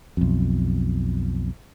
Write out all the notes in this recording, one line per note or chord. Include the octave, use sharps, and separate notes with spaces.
B1 F2